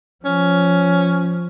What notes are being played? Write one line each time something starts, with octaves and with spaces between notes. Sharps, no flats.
F3 C#4